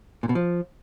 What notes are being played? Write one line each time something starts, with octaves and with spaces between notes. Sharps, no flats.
A#2
B2
F3